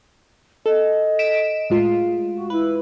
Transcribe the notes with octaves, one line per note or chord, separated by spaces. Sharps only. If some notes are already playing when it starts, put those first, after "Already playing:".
A4 D#5
B6 D7 E7
A2 G#3 F4
F#4
E4 B4